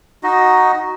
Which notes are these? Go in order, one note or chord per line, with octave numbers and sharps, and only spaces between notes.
D#4 F#4 D#5